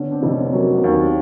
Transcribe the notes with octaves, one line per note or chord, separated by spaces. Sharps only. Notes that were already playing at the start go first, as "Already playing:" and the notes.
Already playing: D3 B3 C#4
C4 D4
F1
B3 C#4
C#4
F#3 A#3 C4
B3 C#4
D#2
C4 D4